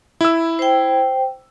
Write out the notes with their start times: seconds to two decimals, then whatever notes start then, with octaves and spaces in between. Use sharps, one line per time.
0.21 E4 E6
0.59 C5 G5